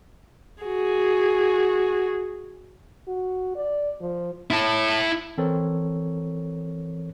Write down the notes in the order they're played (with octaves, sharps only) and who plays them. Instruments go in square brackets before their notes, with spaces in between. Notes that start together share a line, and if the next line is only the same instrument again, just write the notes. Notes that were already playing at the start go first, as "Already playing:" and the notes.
[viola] F#4 G#4
[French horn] F#4
D5
F3
[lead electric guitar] E4 A5
[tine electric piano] E3 C4 A4 A#4 C#5